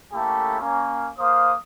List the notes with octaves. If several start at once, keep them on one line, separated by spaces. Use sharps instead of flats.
A3 A#3 C#4 E4 G4 A4
A#3 C#4
A#3 C5 F5 D#6